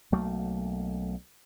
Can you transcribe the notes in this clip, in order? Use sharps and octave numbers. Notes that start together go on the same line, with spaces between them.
B1 F#3 A3 A#3